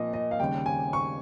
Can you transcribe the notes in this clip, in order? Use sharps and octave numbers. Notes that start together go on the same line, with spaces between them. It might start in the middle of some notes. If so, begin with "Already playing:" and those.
Already playing: A#2 F3 A#3 D#5
D#5
F5
D#2 C#3 G3 G5
G#5
C#6